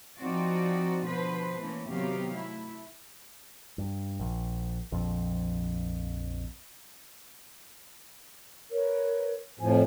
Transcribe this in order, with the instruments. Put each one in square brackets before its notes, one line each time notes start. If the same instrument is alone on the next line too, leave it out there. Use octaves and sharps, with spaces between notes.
[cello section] F3 C4 D#4 F4 F#4 D5
B2 D3 F3 B4 C5
E3 A3 A#3 C#4
C3 D#3 F#3 B3 G4 F5
A3 E4
[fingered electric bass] G2
A#1
A#1 F2
[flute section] A#4 B4 C#5
[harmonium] F2 A2 F3 [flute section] G#5